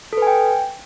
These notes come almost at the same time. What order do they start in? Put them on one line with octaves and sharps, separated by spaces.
A4 B4 G#5 G5